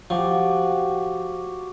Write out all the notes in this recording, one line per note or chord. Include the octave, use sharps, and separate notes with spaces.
F3 F#4 G4